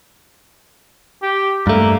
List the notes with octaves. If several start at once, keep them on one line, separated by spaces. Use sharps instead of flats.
G4
G2 A3 A#3